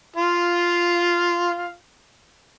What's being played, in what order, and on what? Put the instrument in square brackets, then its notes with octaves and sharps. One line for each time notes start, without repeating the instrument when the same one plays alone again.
[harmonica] F4 F5